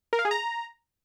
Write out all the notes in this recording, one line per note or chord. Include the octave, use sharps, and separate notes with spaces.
A#4
F5
G#4
A#5